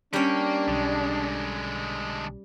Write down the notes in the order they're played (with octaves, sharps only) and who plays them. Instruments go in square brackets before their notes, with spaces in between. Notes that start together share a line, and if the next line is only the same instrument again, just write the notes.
[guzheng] G3 C#4 [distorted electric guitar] A#3 [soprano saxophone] D4
[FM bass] B1 [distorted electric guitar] D3 G#3